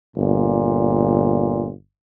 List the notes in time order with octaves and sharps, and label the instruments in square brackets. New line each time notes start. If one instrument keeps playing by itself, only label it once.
[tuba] G1 [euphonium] A#2